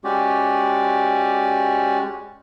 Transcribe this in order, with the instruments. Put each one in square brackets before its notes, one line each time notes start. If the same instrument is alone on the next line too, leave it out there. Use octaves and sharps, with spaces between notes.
[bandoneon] G#3 C#4 F#4 G4 D5